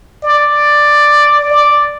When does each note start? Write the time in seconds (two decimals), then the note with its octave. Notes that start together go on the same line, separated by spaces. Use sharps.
0.24 D5
1.50 D5